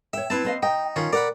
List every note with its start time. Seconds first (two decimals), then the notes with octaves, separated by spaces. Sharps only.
0.13 C#5 E5 G5
0.30 C4 E4 B4 A5
0.45 C4 D#5 F5
0.63 D#4 G5
0.96 D#3 C#4 F4
1.13 A#4 D5 F#5 B5